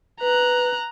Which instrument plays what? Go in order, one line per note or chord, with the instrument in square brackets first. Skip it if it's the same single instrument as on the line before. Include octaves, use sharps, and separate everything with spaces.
[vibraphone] B4 [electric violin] A#5 F#6